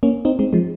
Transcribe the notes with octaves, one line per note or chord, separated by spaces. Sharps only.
A#3 C#4
C4 D#4
G#3 C4
F3 G#3